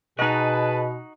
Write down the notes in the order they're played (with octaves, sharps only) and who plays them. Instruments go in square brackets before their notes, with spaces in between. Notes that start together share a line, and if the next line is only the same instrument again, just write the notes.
[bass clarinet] B2 [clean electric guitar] D#4 F#4 [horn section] G#4 B4 A5 [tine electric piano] D#5